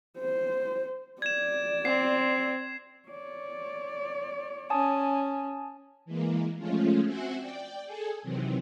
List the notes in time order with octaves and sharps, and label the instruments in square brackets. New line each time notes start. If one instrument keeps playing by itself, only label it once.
[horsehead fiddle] C5
[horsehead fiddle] D5 [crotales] G#6 E7
[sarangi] C4 [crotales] C7
[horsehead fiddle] C#5 D5
[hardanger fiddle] C#4 [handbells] G#5 A5 D#6
[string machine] E3 G#3 A#3
F3 G#3 A3 C#4 F4
C4 F#4 C5 E5 F#5 G#5
D5 G5
G#4 A4 G#5
C3 D#3 E3 F#3 C4